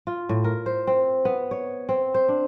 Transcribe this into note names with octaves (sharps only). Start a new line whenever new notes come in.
F4
A2
A#4
C5
C4
B3
C#5
C4
C5
D4